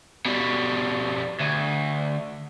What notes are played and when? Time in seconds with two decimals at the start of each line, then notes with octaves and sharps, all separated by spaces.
0.26 B2 G3
1.41 D2